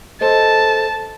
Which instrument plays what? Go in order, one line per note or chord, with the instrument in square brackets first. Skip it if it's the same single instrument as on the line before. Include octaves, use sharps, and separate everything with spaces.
[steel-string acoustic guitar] A4 C5 D#5 [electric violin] A5